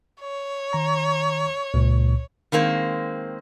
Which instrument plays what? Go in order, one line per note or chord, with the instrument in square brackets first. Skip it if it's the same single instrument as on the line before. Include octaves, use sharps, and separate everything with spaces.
[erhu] C#5
[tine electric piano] D#3 A#5
C#2 A#2
[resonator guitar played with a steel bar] D#3 G#3 A#3 C4